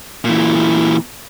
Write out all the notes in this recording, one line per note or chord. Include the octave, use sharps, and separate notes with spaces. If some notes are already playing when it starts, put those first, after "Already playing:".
A#2 E3